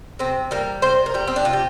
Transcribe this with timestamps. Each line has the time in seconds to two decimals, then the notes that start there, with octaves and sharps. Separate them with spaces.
0.19 C3 C4
0.51 G3 A#3
0.82 C3 C5
1.06 A#4
1.14 G3 G4
1.27 C4
1.36 D4
1.45 C3 F4
1.53 G4